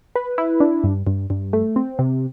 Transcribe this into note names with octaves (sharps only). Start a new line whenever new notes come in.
B4
E4
D4
G2
G2
G2
A3
C4
C3